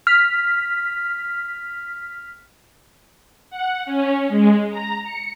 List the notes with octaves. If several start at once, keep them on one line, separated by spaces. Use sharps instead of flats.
F6 B6
F#5
C#4
G#3
A#5
C#7